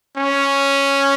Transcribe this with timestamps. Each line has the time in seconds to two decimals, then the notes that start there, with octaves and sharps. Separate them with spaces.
0.17 C#4